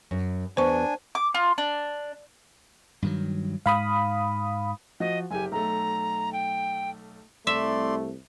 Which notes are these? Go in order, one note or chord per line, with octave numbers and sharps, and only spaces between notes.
F#2
E2 B3 D4 C5 G#5 C#6
D6
F4
D4
G2 D#3 F#3
G#2 F5 B5 D#6
F3 F#4 D#5
F#1 G4 G#5
B1 A3 A#5
G5
C2 A3 D5 E5 C6